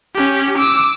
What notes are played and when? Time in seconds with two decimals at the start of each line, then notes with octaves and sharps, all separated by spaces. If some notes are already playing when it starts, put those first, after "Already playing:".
0.14 C#4 G4
0.58 D6 E6